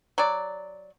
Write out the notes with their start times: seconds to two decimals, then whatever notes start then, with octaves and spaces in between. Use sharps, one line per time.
0.18 F#3 D5